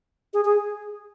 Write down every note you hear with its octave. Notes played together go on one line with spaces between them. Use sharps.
G#4
G#4